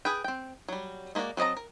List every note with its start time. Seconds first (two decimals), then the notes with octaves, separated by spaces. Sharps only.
0.05 G#4 B4 G5
0.24 C4 G5
0.69 F#3 G3
1.15 G#3 A#3 F4 F#4 D5
1.37 F#3 C4 D#5 A5 A#5
1.57 A#4